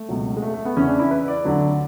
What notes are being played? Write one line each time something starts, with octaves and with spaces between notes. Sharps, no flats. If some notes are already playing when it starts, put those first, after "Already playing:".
Already playing: A3
C#2 B2 F#3
G#3
A3
A3
B3
E2 C#3 E3 C#4
D4
E4
B4
D5
D2 D3 F#3